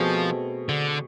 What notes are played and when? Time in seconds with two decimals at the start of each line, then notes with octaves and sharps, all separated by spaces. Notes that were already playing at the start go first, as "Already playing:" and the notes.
Already playing: B2 F3 A3 C4 G#4
0.69 D3